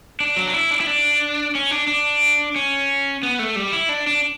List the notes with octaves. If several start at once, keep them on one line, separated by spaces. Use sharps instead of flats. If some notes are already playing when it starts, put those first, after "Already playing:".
D4
F#3
D4
E4
D4
E4
D4
C#4
D4
D4
C#4
B3
A3
G3
E4
D4
D4